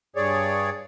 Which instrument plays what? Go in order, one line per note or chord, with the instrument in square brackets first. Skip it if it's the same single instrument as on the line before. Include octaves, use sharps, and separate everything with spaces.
[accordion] G2 G#4 C#5 D5